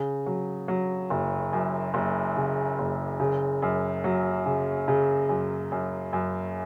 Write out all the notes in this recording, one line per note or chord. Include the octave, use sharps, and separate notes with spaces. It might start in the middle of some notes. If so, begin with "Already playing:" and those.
Already playing: C#3
F#3
F#3
F#1
F#2
F#1
C#3
F#1
C#3
F#2
F#3
C#3
C#3
F#2
F#2
F#2